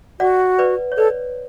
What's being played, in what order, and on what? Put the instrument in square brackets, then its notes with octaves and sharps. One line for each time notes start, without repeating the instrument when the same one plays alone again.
[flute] F#4 [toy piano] D5 F#5
[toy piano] B4 D5
C#5
[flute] A4 [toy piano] B4 D5